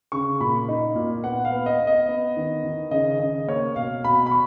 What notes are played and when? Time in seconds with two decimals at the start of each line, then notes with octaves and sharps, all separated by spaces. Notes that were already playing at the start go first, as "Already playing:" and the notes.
0.12 C#3 C#6
0.40 A#2 B5
0.69 D#4
0.95 A#2
1.24 B3 F#5
1.45 F5
1.52 B3
1.66 D#5
1.80 B3
1.87 D#5
2.09 B3
2.37 D#3
2.63 D#3
2.91 C#3 D#5
3.19 C#3 D#5
3.47 A#3 C#5
3.76 B2 F5
4.04 B2 B5
4.26 B5
4.31 C#6